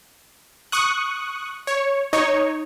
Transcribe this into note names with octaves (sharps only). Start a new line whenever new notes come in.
C#6 D#6 F#6
C#5
D#4 C#5